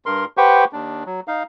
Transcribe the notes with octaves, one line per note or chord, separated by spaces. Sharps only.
G2 A#4 C6
G4 B4 C5 F#5 G5 C#6
D#2 D4
F#3
D#4 F5